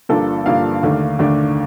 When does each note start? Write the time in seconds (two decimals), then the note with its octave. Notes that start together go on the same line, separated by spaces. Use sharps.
0.09 G1 G2 F3 A#3 D4 A4
0.46 G1 G2 F3 A#3 D4 F5
0.83 D#2 D3 A3 D4
1.19 D#2 D3 A3 D4